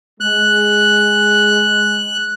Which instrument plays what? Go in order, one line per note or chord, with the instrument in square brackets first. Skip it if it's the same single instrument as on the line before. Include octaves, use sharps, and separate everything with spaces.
[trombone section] G#3 [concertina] F#6